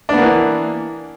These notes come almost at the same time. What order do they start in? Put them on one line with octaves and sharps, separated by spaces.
D4 B3 A#3 E3